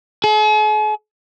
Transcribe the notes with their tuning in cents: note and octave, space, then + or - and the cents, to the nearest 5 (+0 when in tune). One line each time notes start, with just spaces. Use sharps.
G#4 +45